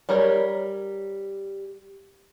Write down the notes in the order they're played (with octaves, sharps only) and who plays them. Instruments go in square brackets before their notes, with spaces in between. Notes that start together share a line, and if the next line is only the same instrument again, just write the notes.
[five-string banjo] G3 A#4 C#5